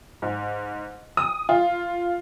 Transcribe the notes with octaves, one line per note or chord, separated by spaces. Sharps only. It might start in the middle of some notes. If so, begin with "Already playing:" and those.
G#2
D#6
F4